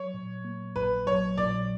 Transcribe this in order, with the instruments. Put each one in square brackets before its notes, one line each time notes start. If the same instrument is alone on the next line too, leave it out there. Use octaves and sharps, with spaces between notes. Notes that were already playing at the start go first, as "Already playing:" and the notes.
Already playing: [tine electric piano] F#3 [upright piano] C#5
[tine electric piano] A#2
A#3
[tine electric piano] A#1 [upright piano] B4
[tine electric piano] F#3 [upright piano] C#5
[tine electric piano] A#2 [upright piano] D5